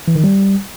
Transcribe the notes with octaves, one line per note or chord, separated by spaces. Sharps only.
E3
D#3
G3